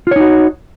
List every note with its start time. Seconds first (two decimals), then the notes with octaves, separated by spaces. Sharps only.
0.07 F4
0.11 C#5
0.16 D#4
0.20 F#4